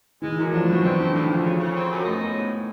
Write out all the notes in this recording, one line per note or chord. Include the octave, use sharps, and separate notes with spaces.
E3 G#3
F#2
F3 D4
G3
B2 F#3
E3 C4
A2 D3
D2 D#3
D2 F3
C#3
C#3
C4
F#2
A3 D#4
A2 B3
G#2